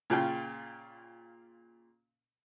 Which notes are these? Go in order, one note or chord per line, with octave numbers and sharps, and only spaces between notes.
A#2 C#3 F4 G5